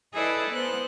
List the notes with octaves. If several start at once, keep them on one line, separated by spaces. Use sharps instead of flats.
E4 G#4 A4 B4 D5 D#5
B3 C5 F#6